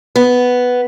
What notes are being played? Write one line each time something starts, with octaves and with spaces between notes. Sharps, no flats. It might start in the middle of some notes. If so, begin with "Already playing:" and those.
B3